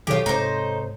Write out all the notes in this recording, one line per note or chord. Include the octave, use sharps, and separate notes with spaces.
B2 D#3 F#3 F4 G4 A4 C#5
G#2 C3 D#4 C5